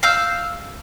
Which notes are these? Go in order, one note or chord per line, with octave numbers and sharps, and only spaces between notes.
F5 E6 G6